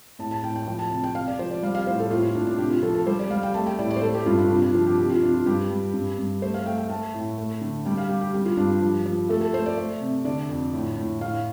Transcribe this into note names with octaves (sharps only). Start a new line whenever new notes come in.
A2 A5
A5
A2 G5
G5
F3 G5
A5
C3 A5
G5
C3 F5
D5
F3 C5
D5
G3 F5
F5
A2 C5
A4
A2 F4
F4
A2 D4
D4
C3 G4
F4
F3 A4
A4
G3 C5
D5
G3 F5
G5
A3 A5
G5
A2 D5
D5
C5
A3 A4
G4
G2 F4
D4
C3 F4
D4
F3 F4
G4
C3 G4
F4
C3 D4
F4
G2 G4
G3
G2
G2
A3 C5
F5
A3 G5
G5
A3 A5
A2
A3
D3
G3 G5
F5
G3 G4
G4
G3 G4
F4
G2 D4
G4
F3
F3
A3 A4
A4
A3 C5
D5
A3
C3
D3 D5
F2
A2
A2
A2 F5